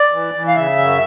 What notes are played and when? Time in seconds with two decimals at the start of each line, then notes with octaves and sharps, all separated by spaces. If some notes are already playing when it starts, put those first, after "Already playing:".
Already playing: D5
0.12 E3
0.34 E3
0.48 F5
0.56 C#3 E5
0.78 F#2